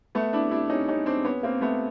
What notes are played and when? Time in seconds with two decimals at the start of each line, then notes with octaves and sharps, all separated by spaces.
0.15 A3 B3
0.33 D4 E4
0.51 D4 E4
0.70 C#4 D#4
0.88 C#4 D#4
1.06 C4 D4
1.25 B3 C#4
1.43 A#3 C4
1.61 A3 B3